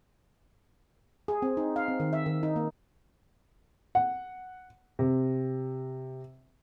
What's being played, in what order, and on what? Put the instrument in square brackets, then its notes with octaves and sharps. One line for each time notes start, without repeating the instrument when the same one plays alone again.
[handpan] G#4
C4
D#4
F5
C4
D#3
E5
D#3
D#4
A#3
[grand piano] F#5
C3